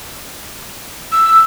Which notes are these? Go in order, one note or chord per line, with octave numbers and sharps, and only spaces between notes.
E6